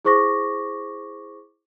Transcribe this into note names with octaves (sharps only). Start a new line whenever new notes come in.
E4 G#4 C5 C#6 D6 A#6